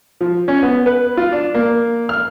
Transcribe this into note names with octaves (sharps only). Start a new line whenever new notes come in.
F3
C#4
B3
B4
F4
D4
A#3
F6